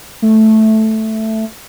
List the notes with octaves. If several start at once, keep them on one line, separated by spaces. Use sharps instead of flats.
A3